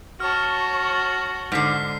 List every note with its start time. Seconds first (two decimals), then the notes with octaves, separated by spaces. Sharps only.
0.20 F#4 C#5 A5 C#6 F6
1.52 G#2 D3 F6 B6 C7